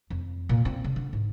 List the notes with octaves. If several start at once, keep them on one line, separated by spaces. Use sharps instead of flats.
F2
A#2
C4
C#3
D3
G#2